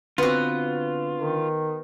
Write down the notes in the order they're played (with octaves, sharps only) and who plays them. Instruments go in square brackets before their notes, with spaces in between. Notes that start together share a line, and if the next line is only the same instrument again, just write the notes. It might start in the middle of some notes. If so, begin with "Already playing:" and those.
[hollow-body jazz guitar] D3 C4 [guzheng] B3 F#4 [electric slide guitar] F4
[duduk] D#3